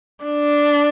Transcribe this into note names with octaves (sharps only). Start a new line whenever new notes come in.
D4